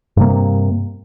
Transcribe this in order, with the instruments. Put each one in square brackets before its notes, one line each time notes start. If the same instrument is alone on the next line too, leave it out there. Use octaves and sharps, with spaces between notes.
[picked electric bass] G2 C3 A#3